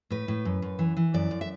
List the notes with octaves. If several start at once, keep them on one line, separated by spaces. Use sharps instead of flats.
A2 B4
A2
F#2
F#2
E3
E3
F#2 D5
F#2
E5